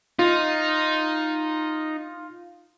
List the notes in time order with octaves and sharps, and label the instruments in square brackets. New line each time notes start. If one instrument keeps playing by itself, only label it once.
[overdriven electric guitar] D#4 [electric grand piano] F4